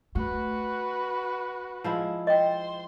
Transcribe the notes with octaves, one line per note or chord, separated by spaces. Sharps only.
A3 F#4 B4
F3 G#3 E4
C5 D#5 G5 C6